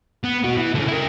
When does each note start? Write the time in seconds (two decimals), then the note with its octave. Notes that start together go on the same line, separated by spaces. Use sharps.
0.24 B3
0.44 B2 F#4
0.57 E3
0.75 D3 C#4
0.88 E4 A#4